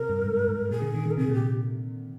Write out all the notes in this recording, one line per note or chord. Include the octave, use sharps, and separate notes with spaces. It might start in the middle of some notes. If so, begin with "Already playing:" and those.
Already playing: C3 A#4
G2
G#2
G#2
A#2 G#4
D3
D#3
D#3
A#4
C3 G#4
A#2 G4